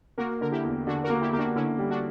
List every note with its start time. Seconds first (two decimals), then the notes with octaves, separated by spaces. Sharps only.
0.18 A#3 F#4 A#4
0.41 D3 A#4
0.52 E4 G4
0.65 E2
0.87 D3 D4 F#4
1.04 F#4 A#4
1.10 A#3
1.21 E4 G4
1.33 A#3 G4
1.39 D4 F#4
1.56 D3 C#4 E4
1.79 G3
1.90 D4 F#4